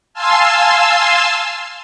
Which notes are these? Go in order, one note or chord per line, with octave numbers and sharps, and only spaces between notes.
F5 G#5 A5 C6 E6